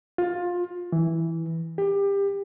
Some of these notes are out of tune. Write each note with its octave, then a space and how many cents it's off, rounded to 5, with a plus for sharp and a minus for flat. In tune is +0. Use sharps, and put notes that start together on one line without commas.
F4 +20
E3 -5
G4 +25